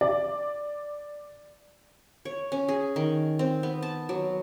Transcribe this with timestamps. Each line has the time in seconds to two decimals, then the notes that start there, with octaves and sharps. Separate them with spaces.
0.01 D5
2.25 C#5
2.52 C#4
2.68 G#4
2.96 D#3
3.39 C4
3.63 B3
3.82 A5
4.09 F#3